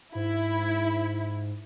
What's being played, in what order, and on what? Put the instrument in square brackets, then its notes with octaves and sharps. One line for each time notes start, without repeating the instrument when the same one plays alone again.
[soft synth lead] G#2 [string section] E4